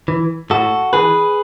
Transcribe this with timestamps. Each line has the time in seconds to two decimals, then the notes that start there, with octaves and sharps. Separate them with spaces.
0.08 E3
0.50 A2 F#4 A4
0.93 E3 G#4 B4